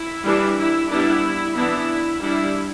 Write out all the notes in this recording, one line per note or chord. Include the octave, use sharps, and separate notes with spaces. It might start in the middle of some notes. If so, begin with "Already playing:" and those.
Already playing: E4
E3 G3 D4
E4
G3 B3 D4 E4
E3 B3 D4 E4
G3 D4 E4